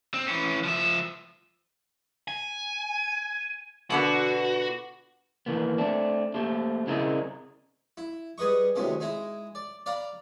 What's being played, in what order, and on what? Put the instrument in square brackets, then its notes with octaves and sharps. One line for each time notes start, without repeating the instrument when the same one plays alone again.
[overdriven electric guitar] C4
E3 C#4
F3 E5
[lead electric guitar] G#5
[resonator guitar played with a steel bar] B2 D3 B3 [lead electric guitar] F#4
[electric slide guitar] D#3 E3 A#3 B3
A3 C4 D4
A3 A#3 G4 C5
C#3 C4 E4 G#4 A#4 D#5
[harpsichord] E4
G3 G#4 B4 D#5 C#6
D2 A2 C3 D#3 G#3
G#3 D#4 E4
D5
D5 F5 A#5 B5